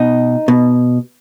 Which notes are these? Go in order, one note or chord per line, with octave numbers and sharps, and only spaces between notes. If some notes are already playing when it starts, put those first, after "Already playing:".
Already playing: B2 D#4
B2